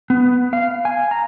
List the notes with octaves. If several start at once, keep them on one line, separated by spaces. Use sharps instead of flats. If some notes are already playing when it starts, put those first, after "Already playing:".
B3
F5
G#5
A#5